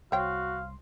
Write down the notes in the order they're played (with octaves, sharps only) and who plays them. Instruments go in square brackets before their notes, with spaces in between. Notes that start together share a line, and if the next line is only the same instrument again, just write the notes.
[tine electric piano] C2 C6 [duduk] F#4 [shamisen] C5 C#5 G5 [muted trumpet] F5